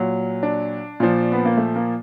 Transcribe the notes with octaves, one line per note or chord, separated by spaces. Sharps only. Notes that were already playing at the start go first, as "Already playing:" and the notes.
Already playing: A#2 F#3
D4
A#2 F3
B3
A#3
A3
A#3